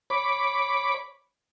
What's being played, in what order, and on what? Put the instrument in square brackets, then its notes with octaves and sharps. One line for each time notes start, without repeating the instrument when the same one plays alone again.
[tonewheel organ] C#5 B5 D6